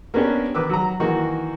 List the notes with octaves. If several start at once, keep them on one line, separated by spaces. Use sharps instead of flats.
A#3 B3 C#4 D4 G4
D#3 B4 D6 E6
F#3 A#5
D#3 E3 A#3 D#4 F#4